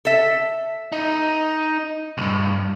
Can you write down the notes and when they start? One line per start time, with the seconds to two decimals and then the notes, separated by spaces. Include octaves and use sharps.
0.05 A4 E5
0.92 D#4
2.18 B1 G2